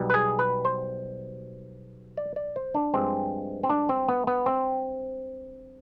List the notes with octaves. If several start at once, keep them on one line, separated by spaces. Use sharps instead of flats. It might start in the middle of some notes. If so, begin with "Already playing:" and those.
Already playing: B1 B2 G3
B4
G#4
B4
C5
D5
D5
C5
D4
G2 F3 G#3 C4
C4
D4
C4
B3
B3
C4